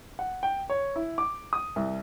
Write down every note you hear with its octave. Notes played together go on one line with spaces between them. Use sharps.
F#5
G5
C#5
E4
D6
D#6
C2